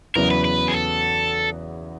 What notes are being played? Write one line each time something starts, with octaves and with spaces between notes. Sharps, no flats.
E2 C#3 F#3 B3 E4 A#4
B4
B4
G#4
A4